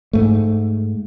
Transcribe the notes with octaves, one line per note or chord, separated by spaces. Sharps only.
G#2 A3